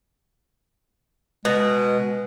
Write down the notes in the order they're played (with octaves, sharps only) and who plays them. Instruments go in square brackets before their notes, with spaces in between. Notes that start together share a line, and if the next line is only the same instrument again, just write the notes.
[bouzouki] B2 [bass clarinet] G#3